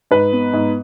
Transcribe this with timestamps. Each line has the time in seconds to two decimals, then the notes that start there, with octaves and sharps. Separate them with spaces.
0.11 G#2 B4
0.33 B3
0.53 G#2